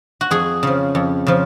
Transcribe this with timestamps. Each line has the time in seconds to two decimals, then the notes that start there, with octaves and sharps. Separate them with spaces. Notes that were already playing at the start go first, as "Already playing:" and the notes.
0.21 F#4
0.31 F2 G#4
0.63 C#3 F3
0.95 F2
1.27 C#3 F3